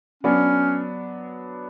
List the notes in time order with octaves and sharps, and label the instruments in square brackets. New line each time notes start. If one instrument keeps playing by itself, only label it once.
[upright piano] F#3 B3 D4 [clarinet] C#4